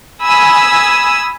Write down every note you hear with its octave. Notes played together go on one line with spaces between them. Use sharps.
G#5 B5 D#6 E6